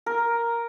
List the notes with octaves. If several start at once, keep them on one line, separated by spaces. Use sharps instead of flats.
A#4